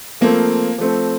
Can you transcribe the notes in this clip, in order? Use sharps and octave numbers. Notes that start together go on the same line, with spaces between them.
F3 A3 A#3 C4
F3 A3 C4